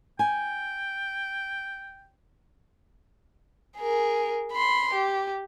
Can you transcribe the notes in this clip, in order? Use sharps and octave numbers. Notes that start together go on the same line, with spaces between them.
G5 G#5
G#4 A#4
B5 C6
G4